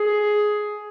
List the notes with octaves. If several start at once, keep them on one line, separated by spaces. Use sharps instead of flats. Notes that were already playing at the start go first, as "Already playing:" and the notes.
Already playing: G#4